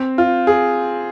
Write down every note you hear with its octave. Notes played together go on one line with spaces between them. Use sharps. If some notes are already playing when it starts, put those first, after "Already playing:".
Already playing: C4
F4
G#4